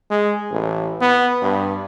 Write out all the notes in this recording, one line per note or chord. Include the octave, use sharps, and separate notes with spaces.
G#3
A1
B3
G2